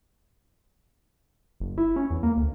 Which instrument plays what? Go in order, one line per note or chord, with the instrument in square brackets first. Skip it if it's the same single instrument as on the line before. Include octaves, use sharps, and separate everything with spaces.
[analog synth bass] F#1
E4
C#4
E2
A#3
D2